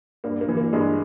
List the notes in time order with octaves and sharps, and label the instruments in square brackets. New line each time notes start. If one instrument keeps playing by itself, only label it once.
[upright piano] G2 A#3
A#3
E3
A#3
G2 G#3